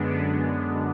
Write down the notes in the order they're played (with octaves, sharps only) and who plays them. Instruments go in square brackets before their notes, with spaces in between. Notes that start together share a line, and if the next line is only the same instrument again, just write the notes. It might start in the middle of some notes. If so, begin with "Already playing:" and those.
Already playing: [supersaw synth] F#2 D3 G#3 B3 D4